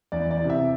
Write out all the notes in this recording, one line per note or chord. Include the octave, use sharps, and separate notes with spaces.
E2 D5
D5
C3 E3
E5